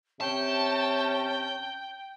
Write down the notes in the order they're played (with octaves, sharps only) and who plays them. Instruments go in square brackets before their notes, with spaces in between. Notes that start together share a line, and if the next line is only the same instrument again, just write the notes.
[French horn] C3 [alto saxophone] C#4 [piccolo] G5 [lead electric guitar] A5